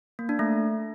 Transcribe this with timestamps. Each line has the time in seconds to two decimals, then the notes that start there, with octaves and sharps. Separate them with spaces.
0.19 A#3
0.29 D4
0.39 A3